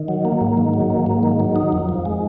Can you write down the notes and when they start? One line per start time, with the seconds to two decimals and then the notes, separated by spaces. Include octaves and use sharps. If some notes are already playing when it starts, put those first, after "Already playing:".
Already playing: D#3
0.08 F#3
0.25 A#3
0.41 G#2
0.57 D#3
0.74 F#3
0.90 A#3
1.06 G#2
1.23 D#3
1.40 F#3
1.56 D#4
1.72 F2
1.89 F3
2.05 G#3